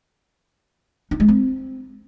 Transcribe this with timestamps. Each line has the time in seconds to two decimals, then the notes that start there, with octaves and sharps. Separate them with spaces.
1.11 D#4
1.20 G#3
1.28 C4